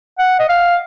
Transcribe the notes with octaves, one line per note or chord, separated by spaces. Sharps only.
F#5
D#5
F5